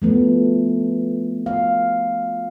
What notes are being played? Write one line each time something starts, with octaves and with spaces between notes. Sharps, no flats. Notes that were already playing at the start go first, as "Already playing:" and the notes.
F3 A3 B3
F5